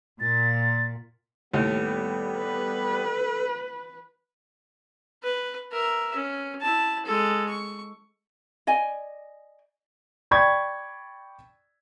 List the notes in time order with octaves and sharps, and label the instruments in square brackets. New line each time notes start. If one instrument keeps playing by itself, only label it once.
[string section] A#2 [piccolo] A6
[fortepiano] D#2 A2 [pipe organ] G3 B3 [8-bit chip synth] A4
[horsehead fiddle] B4
[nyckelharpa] B4
A#4 E5
C#4
E4 A5
G#3 A4
C#6
[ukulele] D5 D#5 G#5
[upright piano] D5 G5 B5 C#6 G#6